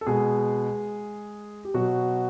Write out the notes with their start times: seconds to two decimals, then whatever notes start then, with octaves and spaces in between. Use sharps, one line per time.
0.01 A4
0.07 B2 G#3 G#4
1.65 G4
1.74 B2 F#3 F#4